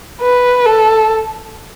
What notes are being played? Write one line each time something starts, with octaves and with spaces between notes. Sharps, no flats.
B4
A4